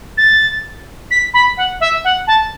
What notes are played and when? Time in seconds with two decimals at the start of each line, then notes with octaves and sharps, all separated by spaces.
0.18 A6
1.11 B6
1.34 B5
1.57 F#5
1.81 E5
2.04 F#5
2.27 A5